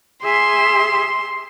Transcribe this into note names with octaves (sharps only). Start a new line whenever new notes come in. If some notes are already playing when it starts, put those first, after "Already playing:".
G#4 E5 C6